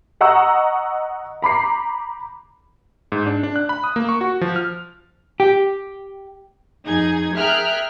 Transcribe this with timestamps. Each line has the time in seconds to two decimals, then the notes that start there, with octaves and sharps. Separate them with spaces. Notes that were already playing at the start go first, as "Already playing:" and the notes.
0.21 D#5 F#5 A#5 C#6 E6
1.42 A#5 B5 D6 C7
3.12 G#2
3.27 D4
3.43 D4
3.56 F#6
3.69 B5
3.84 D#6
3.96 A#3
4.09 C#6
4.21 F#4
4.41 F3
4.56 F6
5.40 G4
6.87 F2 D#4 G#4 G#6
7.36 G#4 A#4 E5 G5 F6 F#6